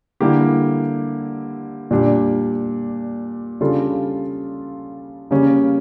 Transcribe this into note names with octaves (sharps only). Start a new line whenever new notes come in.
D3 G3 A#3 E4 G4
A#2 G3 D4
C#3 G3 D4 F4 A4
C#3 G3 A#3 C#4